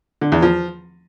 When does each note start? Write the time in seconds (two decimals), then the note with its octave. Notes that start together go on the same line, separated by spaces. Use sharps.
0.21 D3
0.32 E2
0.42 F3